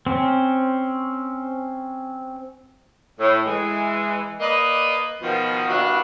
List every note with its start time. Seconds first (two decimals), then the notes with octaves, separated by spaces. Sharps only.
0.07 C4 C#4
3.20 A2
3.45 E3 G#3
4.40 A#3 B4 D5 D#5
5.22 B2 D#3 F3
5.69 G3 A#3 B3 D4 E4 F#4